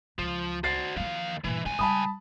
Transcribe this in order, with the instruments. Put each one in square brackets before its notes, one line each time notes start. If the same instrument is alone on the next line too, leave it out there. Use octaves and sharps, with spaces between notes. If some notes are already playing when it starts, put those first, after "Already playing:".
[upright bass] C#2 [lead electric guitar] F3
[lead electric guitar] F#4 C5 [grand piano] A6 C7
[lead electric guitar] D#2 F5 [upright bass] E3 F3
[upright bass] G2 A#2 [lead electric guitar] E3
[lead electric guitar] C#2 G#5 [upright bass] E3
[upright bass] G3 [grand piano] A5 B5 D#6